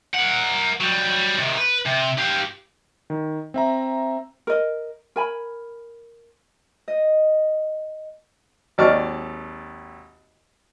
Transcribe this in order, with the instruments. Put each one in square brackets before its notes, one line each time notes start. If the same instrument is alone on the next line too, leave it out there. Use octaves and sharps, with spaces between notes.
[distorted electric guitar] A#4 F#5
F#3 G3
C3 D#3
B4
C3
G4 F5
[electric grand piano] D#3
C4 E5 A#5
[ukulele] A#4 D#5
A#4 G#5 B5
[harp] D#5
[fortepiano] G#1 D#2 D5 A5 C#6 F6